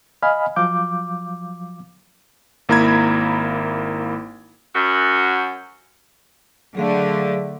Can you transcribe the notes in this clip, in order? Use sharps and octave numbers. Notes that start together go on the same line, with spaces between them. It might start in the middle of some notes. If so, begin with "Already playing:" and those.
D#5 F5 G#5 B5 F6
F3 F#3 F5 D6 G6
G#1 A#3 E4 A#5 B5 G#6
F#2 F#4
D3 F#3 A3 G#4 F5